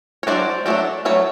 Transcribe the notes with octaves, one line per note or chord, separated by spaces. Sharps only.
C#5
F#3 A3 D4 C5 D5
F#3 A3 D4 D5
F#3 A3 C#5